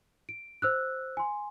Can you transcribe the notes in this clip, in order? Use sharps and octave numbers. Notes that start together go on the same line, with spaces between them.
D7
C5 E6 F#6
G#5 C6